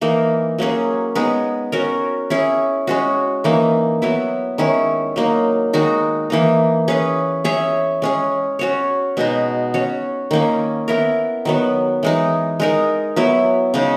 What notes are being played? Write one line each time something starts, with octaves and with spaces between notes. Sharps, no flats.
E3 A#3 D#4 A#4
F#3 A#3 C#4 G#4
G#3 B3 D#4
C#4 F#4 A#4
C#4 E4 G#4
G#3 C#4 F#4
E3 A#3 D#4
F#3 B3 E4
D#3 G#3 C#4 E4
F#3 A#3 D#4
D#3 G#3 D#4 F#4
E3 A#3 D#4
C#4 G#4 B4
C#4 G#4 C#5 E5
G#3 C#4 G#4
C#4 F#4 C#5
B2 G#3 B3 D#4
C#4 F#4 C#5
D#3 A#3 C#4
B3 E4 A#4
D#3 F#3 B3
E3 G#3 D#4
G#3 D#4 A#4
F#3 B3 E4
C#3 G#3 D#4